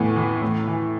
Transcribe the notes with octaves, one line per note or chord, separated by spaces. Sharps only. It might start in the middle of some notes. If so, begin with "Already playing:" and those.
Already playing: A2 E3 B3
E3
A2
E3